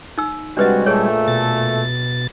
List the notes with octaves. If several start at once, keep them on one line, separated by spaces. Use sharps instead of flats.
D#4 E6
C3 G3 G#3 D4 F#4 B4 D#5
A#2 A3 G#4 C#5
B2 A6